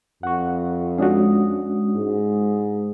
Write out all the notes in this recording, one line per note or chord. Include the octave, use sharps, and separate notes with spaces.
F2 F#5 C#6
G#3 C#4 D4 F#4 D#6
G#2